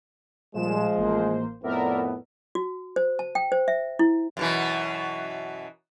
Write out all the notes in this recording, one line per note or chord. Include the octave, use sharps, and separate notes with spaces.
A#2 F3 G3 G#3 E7
A1 A#3 C5
F2 A2 B3 A#4 D5 E5
F#4
C5
A5
G5
C5
E5
E4
F#2 B2 E3